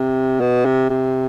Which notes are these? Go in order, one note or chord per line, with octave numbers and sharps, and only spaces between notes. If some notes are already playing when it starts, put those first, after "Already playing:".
Already playing: C3
B2
C3
C3